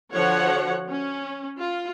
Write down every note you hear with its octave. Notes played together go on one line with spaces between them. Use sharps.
D3 F3 F#4 C#5 F#5
C#4
F4